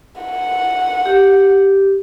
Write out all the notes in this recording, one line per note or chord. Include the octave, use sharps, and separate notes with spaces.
F#5
G4